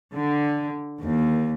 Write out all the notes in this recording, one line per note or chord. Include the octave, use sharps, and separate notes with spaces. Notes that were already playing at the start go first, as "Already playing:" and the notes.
D3
D#2